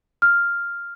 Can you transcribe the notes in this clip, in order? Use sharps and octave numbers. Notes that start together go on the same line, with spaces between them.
F6